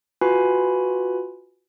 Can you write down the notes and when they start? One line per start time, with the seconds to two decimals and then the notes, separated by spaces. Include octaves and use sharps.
0.21 F4 F#4 B4 G#5 B5